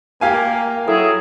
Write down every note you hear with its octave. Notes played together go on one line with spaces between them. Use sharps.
A#3 G4 F5 G#5
F#3 E4 G#4 A4